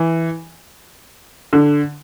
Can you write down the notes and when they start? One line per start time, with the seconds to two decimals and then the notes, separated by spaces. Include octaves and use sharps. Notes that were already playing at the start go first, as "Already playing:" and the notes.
Already playing: E3
1.53 D3